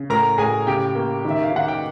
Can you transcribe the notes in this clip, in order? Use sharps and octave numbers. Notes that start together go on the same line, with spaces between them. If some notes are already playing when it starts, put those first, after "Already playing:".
Already playing: C#3
A2 A#4 A#5
A2 G#4 G#5
C#3 G4 G5
A#3
D#3
E5
F5
D#3 F#5
G5